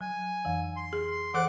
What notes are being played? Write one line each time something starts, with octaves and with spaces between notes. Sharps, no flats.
F#3 G#5
F2 E3
C6
G#4
E3 A4 C5 F#5 D6